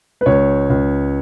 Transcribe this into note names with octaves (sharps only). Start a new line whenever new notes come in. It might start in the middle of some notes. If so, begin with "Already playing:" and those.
B4
C#2 C#5
C#2